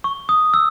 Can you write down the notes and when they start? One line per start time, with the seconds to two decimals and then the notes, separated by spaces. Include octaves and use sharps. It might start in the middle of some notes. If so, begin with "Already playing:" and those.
0.04 C#6
0.29 D#6
0.54 E6